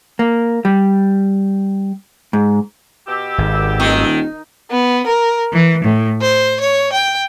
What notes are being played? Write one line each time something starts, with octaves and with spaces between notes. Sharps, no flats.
A#3
G3
G#2
B2 G4 E6
G#1
D#1 D#3
B3
A#4
E3
A2
C5
C#5
G5